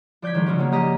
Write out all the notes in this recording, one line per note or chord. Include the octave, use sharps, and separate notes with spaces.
F3 D5 G6 G#6 B6
D#3 F3 G#3
C#3 F#3 G#3 C#4
F3 G#3 A#3
G4 D#5 A#5 A#6 D#7